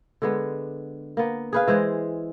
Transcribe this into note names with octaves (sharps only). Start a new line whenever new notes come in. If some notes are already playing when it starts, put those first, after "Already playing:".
D3 G#3 B3
A#3 B3
G#4 B4 F5
E3 G#3 C5 D#5